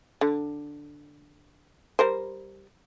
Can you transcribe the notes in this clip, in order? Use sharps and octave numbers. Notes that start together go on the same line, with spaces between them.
D3
G3 A#4 C5